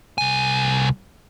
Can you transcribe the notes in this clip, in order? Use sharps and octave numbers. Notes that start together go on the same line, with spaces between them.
C2 G#5